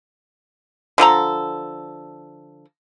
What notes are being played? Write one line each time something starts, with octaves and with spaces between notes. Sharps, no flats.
D3 F3 A4 A#5